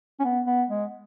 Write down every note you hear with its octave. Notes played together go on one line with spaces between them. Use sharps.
C#4
B3
B3
G#3